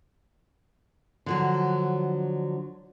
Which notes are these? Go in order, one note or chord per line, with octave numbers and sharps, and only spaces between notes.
D3 F3 F#3